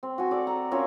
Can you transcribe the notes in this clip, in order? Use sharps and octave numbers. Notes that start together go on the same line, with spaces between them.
C4
F#4 G#5
A4 D5
A#5
C#4 F4 A#4 E5